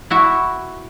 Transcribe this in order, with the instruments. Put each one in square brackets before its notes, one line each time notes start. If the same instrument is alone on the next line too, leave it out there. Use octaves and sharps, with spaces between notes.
[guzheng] E4 F#4 E5